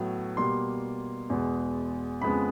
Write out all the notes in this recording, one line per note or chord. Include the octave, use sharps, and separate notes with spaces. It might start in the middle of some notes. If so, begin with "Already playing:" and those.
Already playing: A2 F#3 B3
B2 G3 A#3 C6
E2 B2 G#3
F2 C#3 F3 G#3 B3 B5